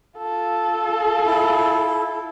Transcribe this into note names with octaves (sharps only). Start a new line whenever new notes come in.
F4 A4
E4